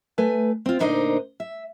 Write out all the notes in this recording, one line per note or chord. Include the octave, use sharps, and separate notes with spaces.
A3 B4 G#5
C4 F4
D2 A#2 D4 D#4 C5 D#5
E5